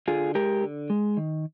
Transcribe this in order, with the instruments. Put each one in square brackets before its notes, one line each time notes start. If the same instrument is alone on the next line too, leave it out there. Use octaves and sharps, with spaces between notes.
[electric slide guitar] D3 F4 G#4
G#3 G4 A#4
D3
G#3
D#3